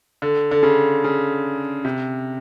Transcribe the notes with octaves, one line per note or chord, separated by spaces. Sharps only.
D3
D3
C#3
C#3
C3